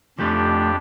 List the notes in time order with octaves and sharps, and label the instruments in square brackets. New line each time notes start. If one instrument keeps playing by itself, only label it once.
[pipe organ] F2 D4 G4 [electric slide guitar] F3 A3